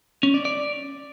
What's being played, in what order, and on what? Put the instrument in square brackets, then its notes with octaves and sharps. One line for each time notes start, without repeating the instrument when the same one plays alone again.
[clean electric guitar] C#4
D5
D5